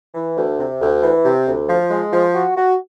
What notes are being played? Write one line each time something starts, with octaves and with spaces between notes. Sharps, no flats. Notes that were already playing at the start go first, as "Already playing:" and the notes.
E3
D2
C3
D2
E3
C3
D2
F3
G#3
F3
F#4
F#4